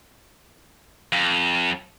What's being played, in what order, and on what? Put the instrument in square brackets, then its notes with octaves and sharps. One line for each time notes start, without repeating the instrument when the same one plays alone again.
[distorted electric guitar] F2